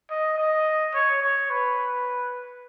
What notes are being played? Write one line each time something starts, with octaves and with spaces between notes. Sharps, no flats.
D#5
D#5
C#5
C#5
B4